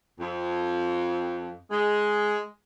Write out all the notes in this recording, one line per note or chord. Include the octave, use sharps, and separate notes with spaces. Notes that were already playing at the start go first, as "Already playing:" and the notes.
F2
G#3